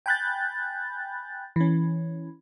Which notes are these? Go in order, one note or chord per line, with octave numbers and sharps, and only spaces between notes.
G5 G#5 B5 F#6 G6 A6
E3 C#4